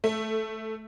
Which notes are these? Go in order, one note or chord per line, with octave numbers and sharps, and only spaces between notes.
A3